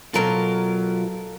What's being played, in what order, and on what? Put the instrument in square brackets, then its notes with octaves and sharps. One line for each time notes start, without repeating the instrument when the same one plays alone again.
[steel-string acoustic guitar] B2 F#3 F4 [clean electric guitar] A4 A#4